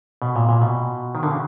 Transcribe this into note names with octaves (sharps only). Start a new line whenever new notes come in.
B2
A#2
A#2
B2
D#3
D3
C#3